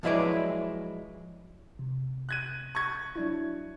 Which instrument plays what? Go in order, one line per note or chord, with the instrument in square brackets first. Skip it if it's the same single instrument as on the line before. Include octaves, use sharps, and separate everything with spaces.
[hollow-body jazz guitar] F3 F#3 G#3 E4 B4 D5
[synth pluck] C3
[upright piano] F#6 G#6 D#7
C#6 G#6
[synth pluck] F#3 D4 E4